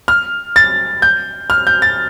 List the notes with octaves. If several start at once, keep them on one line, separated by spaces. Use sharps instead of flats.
F6
A6
G6
F6
G6
A6